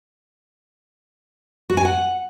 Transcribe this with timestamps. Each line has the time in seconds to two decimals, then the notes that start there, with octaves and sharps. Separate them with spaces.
1.70 F#4
1.77 G#5
1.85 F#5